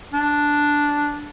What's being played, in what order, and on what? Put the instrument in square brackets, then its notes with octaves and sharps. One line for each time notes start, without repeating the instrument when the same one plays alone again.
[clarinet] D4